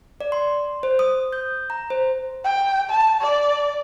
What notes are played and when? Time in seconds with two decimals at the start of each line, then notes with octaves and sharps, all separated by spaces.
0.21 D5
0.32 C6
0.83 C5
0.99 D#6
1.33 G6
1.70 A#5
1.90 C5
2.44 G5
2.90 A5
3.21 D5